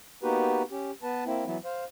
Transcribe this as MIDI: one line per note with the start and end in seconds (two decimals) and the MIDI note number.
0.23 0.62 58
0.23 0.62 59
0.23 0.62 63
0.23 0.62 66
0.23 0.62 67
0.23 0.62 71
0.71 0.91 61
0.71 0.91 67
1.03 1.24 59
1.03 1.24 71
1.03 1.24 81
1.26 1.45 58
1.26 1.45 60
1.26 1.45 64
1.46 1.57 52
1.46 1.57 54
1.46 1.57 59
1.46 1.57 64
1.65 1.84 72
1.65 1.84 77